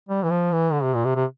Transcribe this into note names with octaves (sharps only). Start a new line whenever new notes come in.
G3
E3
F3
E3
D3
C3
A#2
C3
C3